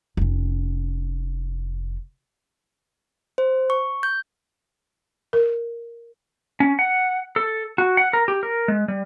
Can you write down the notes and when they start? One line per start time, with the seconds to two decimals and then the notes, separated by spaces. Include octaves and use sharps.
0.17 F1 C#4
3.38 C5
3.70 C#6
4.03 G6
5.33 A#4
6.60 C#4
6.79 F#5
7.36 A4
7.78 F#4
7.97 F#5
8.13 A#4
8.28 G4
8.43 A#4
8.68 G#3
8.88 G3